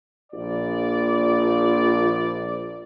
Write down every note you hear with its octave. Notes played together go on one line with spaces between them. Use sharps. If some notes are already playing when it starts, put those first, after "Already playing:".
A#1 D5